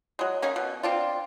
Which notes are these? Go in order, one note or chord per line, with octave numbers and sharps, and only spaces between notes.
F#3 G#3
A#3 C#4 D#4 G#4
B2
C4 D4 F4